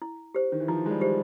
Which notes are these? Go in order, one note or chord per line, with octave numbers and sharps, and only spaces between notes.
E4
G4 C5
D#3
E3
F3 E4
G#3
G3
G4 C5